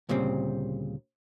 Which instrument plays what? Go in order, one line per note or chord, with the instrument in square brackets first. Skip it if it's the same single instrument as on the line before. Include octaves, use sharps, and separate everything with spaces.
[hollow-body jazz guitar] D2 A#2 C#3 G3 C4